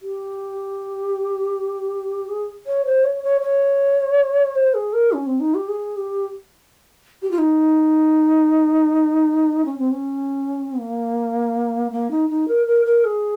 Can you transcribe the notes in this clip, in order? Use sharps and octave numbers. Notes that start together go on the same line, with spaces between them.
G4
G#4
C#5
C5
C#5
C#5
C#5
C5
G#4
A#4
C#4
C4
D#4
G4
G#4
G4
G4
F4
D#4
C#4
C4
C#4
A#3
A#3
D#4
D#4
A#4
A#4
A#4
G#4